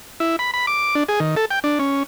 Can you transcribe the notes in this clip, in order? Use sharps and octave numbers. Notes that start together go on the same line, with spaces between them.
E4
B5
B5
D6
D4
G#4
D#3
A4
G5
D4
C#4